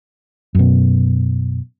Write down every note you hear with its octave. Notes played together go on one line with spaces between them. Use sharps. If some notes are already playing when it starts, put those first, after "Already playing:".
F#2 B2